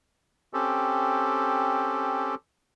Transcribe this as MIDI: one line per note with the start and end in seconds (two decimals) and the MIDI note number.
0.53 2.35 60
0.53 2.35 61
0.53 2.35 67
0.53 2.35 69